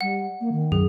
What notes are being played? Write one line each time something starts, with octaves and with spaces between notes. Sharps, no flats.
G3 F#5
A#3
D#3
F#2 G#4